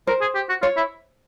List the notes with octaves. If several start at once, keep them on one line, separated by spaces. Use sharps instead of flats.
A#4 C5
G#4
G4
F#4
F4 C#5
E4